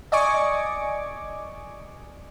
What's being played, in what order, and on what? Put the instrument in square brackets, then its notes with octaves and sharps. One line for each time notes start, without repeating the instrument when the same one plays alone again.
[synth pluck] D5 D#5 G#5 C#6 D6